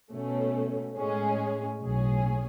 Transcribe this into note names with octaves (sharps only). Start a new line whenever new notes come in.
B2 A3 C#4
A2 G#3 C#4 G#4
B1 A2 F#3 C#4 G#4